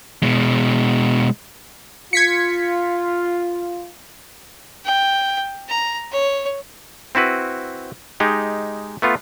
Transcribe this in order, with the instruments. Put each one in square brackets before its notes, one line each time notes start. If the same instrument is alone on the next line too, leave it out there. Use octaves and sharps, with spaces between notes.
[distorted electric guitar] B2 G#3
[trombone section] F4 [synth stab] G#6 B6 C#7
[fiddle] G5
A#5
C#5
[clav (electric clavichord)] C4 E4 F#4 B4
G#3 D#4 G4
A3 B3 F4